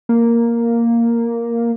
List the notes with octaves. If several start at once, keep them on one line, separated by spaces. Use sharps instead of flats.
A#3